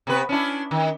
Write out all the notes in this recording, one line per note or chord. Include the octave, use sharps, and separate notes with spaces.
C3 B3 B4
C#4 D4 E4
D#3